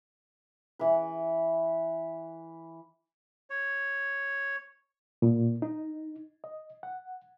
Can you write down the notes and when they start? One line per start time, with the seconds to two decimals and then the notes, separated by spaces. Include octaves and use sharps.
0.79 E3 B4
3.50 C#5
5.22 A#2
5.62 D#4
6.44 D#5
6.83 F#5